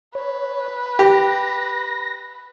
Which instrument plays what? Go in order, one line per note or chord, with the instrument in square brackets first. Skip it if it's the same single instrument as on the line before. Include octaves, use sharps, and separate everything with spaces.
[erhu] B4 [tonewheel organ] C#5
[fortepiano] G4 [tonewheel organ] A#6